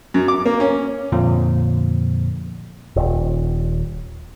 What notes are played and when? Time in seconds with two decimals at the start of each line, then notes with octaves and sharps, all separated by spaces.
0.14 F#2
0.28 D6
0.45 A#3
0.60 C#4
1.12 F2 A#2 D3 F3
2.96 D#1